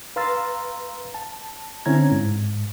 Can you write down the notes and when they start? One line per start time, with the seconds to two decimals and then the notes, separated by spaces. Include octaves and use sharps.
0.16 B4 F5 A#5 C6 E6 A6
1.15 A5
1.86 D3 C4 C#4 E4 A#5 G#6
2.12 G#2